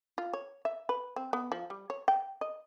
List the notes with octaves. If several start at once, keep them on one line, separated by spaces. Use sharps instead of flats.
F4
C#5
E5
B4
C4
B3
F3
G3
C#5
G5
D#5